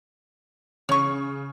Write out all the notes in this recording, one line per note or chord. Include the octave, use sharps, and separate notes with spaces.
C#3 C#5 C#6